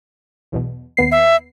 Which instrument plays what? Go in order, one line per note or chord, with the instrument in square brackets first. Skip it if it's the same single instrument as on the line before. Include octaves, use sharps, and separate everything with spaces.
[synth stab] B1 E2 B2
D#2 B3 C7
[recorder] E5